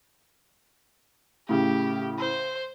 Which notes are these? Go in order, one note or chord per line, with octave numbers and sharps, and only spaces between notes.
A2 C#3 G4
C5